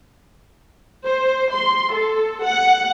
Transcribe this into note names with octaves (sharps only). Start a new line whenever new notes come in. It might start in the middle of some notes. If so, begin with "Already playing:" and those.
C5
C6
A4
F#5